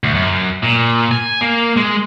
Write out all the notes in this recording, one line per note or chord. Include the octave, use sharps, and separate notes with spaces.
D2
F#2
A#2
G#5
A#3
G#3